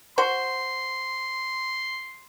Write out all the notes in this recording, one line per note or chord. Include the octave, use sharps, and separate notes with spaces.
F#4 C5 C6